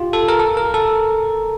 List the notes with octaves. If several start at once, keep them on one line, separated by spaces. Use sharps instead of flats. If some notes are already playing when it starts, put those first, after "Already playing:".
Already playing: F4 G4
A4
A#4
A4
A#4
A4